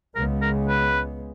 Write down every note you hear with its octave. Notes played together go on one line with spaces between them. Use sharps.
C#2 C#3 G#3 B3 A#4
A#4
B4